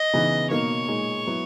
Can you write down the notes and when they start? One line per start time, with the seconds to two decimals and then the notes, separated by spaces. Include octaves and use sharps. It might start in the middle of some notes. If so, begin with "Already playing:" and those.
Already playing: D#5
0.13 C#3 E3 B3 D#4
0.50 B2 A#3 D#4 C#5
0.88 A#2 G#3 D#4
1.26 F#3 B3 E4